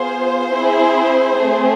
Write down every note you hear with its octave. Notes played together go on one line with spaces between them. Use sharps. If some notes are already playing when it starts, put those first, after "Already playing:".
Already playing: B3 F4 G#4 C5
C4 E4 G#4
A3 C4 G#4